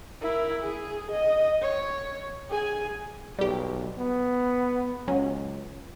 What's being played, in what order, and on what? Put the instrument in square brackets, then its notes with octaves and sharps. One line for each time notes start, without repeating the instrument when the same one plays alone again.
[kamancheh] E4 A#4
G#4
D#5
C#5
G#4 G#5
[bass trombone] B1 [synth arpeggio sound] G3 G4
[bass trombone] B3
[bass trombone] C#2 [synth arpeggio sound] F#3 C#4